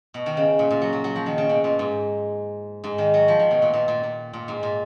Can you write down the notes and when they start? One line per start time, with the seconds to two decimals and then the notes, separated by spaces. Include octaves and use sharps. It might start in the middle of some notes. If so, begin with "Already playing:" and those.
0.14 B2
0.26 D#3
0.37 C#3
0.59 A#2
0.71 A#2
0.82 F#3
0.93 F#3
1.04 F#3
1.16 F3
1.26 D#3
1.38 C#3
1.49 B2
1.64 A#2
1.79 G#2
2.84 G#2
2.98 D#3
3.14 F#3
3.28 F3
3.39 D#3
3.51 B2
3.62 A#2
3.73 A#2
3.88 A#2
4.03 A#2
4.33 A#2
4.48 G#2
4.63 A#2